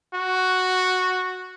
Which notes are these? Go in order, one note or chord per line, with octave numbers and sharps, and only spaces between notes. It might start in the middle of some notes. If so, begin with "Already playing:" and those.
F#4